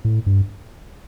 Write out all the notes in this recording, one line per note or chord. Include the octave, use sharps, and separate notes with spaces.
A2
G2